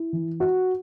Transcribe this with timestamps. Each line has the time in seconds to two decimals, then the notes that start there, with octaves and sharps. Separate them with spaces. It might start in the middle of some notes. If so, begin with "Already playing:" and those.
Already playing: E4
0.13 E3
0.40 F#4